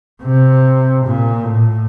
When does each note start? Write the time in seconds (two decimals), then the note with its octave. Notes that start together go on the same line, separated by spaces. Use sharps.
0.23 C3
1.05 A#2
1.45 A2